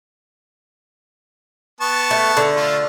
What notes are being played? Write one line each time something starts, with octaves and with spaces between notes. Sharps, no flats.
B3 A5 C#6
A3
D3
A3 F4